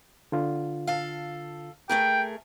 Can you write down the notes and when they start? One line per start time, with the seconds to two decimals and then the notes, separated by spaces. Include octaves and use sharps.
0.32 D3 F4
0.87 A4 F5
1.89 A3 G#4 A#4 G5